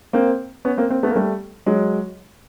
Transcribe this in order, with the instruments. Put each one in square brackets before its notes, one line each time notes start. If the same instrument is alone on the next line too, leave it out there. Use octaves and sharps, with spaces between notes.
[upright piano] A#3 C4
B3 C#4
A#3 C4
A#3 C4
A3 B3
A#3
G3 A3
F#3 G#3